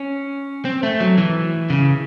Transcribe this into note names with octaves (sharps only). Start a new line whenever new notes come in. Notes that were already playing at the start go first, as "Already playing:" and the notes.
Already playing: C#4
C4
A3
F#3
E3
C#3